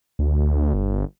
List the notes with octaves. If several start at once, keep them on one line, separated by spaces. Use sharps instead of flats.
D2
G1